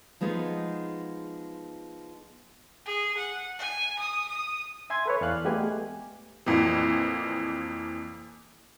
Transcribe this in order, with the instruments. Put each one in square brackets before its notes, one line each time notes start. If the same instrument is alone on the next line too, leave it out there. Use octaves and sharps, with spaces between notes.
[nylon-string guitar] F3 G#3 B3 D#4
[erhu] G#4
F#5
G#5
D#6
D#6
[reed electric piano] E5 G#5 C6 G#6
A4 B4 C#5
E2 D5 F5 F#6
G#3 A3 B3 G4 G#5
[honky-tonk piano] F2 A#2 E3